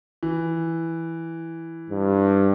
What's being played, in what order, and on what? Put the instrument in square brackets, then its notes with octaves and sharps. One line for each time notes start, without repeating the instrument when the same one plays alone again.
[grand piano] E3
[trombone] G2